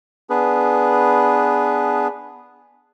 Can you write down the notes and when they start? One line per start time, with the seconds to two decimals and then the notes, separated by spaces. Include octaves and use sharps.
0.30 B3 D4 G#4 B4